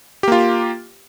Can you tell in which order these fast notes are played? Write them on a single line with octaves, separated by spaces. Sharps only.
G4 A#3 F4